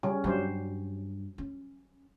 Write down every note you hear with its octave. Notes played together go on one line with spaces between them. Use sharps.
C#3 G3 C#4
G2 F#3 G3 C5
C#4